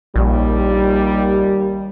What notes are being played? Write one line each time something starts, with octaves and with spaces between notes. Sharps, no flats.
A#1 D#2 G3